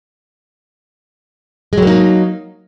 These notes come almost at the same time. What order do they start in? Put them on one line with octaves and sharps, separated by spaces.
G#3 F#3 A#3 D#4